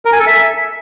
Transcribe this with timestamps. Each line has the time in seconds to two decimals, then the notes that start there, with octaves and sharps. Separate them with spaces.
0.05 A#4
0.13 G#5
0.20 A4
0.27 E5